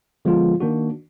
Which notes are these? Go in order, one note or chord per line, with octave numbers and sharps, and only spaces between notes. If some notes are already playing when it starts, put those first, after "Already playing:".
D3 F3 G#3 B3 F4
D#3 A#3 D4 F#4